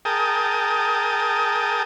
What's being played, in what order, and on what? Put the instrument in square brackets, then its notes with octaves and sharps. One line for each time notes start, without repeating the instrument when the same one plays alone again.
[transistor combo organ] G#4 A#4 G5 A5 D#6